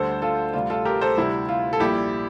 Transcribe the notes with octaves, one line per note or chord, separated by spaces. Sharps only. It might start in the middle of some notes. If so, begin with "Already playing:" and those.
Already playing: D2 D3 G3 A4 C5
F4 A4
D2 C3 G3 F4
F4 A4
G4 A#4
A4 C5
D2 C3 G3 E4
F4
A4
A#1 A#2 G3 E4 G4